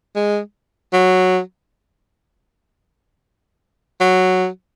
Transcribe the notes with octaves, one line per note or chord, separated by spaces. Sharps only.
G#3
F#3
F#3